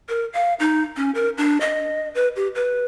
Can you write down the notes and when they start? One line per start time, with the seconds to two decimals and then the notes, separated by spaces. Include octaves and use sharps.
0.09 A#4
0.33 F5
0.60 D#4
0.97 C#4
1.15 A#4
1.38 D4
1.61 D#5
2.15 B4
2.36 G4
2.55 B4